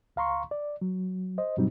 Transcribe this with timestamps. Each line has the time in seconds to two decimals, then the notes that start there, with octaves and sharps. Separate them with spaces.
0.16 C#2 F5 A#5 C6 C#6
0.51 D5
0.81 F#3
1.38 C5 D#5
1.57 G2 B2 F#3 G3 C4 D#4